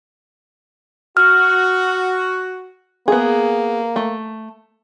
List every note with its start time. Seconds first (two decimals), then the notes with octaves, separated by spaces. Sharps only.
1.17 F#4 F6
3.08 A#3 B3 G#4
3.96 A3